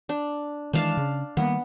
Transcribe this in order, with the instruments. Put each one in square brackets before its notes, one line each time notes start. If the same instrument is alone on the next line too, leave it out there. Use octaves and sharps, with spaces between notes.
[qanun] D4
[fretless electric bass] D#3 E3 G#3 [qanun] D4 F5 A5
[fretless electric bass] C#3
[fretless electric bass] D#3 G3 A#3 [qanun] B3